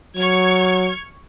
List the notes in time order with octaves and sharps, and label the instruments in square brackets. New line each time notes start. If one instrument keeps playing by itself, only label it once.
[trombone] F#3 [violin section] C#6 F6 G#6